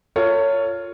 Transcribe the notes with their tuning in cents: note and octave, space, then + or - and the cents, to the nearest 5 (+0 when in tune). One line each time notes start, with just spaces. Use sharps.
F4 +0 A4 +45 C#5 +10